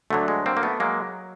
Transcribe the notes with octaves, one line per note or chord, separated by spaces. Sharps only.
D2 D3 F#3 A3
G#3
A#3 C4
A#3
A3 B3
F#3 G#3 A#3